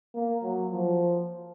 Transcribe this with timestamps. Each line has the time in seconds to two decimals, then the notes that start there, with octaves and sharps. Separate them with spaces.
0.14 A#3
0.43 F#3
0.71 F3